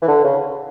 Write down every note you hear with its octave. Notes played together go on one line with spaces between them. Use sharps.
E3
D3
C#3